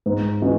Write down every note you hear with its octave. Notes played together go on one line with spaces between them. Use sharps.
G#2
E3 G#3 C#4 F#4